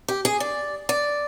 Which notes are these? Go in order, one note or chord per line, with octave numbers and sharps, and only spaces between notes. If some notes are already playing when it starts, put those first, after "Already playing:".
G4
G#4
D5
D5